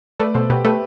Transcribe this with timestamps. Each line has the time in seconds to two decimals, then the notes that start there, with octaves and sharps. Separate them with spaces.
0.19 A3 B4 D5
0.34 B2 A4 C5
0.50 B2 G4 B4
0.65 A3 G4 B4